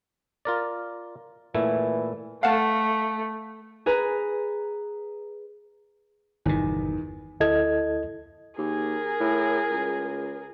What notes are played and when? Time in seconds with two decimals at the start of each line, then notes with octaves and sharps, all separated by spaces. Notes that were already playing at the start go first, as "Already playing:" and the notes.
0.45 F4 A#4 D5
1.54 A#2 E3 A3 E4
2.43 A3 F5 F#5 A5
3.86 G#4 B4 A#5
6.46 G1 E2 B2 D#3
7.40 D2 E4 A4 D#5 G#6
8.58 D#2 G#4 A#4
9.20 A2
9.71 C#2